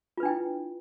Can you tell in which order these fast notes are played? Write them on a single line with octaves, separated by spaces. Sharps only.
F4 B4 D4 G5 E4